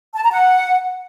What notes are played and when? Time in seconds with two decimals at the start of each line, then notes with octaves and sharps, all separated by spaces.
0.15 A5
0.23 A#5
0.31 F#5